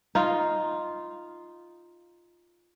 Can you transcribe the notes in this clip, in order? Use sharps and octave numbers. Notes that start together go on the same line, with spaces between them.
D#4 F4